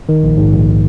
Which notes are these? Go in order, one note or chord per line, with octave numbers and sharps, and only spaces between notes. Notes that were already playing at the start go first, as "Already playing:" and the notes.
D#3
A#1
G#2
A#1